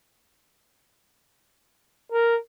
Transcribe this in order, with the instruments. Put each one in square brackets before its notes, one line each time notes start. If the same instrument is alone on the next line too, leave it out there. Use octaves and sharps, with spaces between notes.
[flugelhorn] A#4